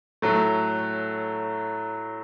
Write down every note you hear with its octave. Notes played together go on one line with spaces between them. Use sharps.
A2 F#3 A3